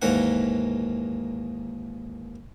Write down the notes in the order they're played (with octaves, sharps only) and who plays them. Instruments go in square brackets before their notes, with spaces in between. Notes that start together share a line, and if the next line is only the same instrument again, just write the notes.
[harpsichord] D#2 G#2 E3 A#3 F#5